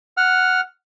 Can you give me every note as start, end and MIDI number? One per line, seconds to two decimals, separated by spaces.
0.17 0.61 78
0.17 0.61 89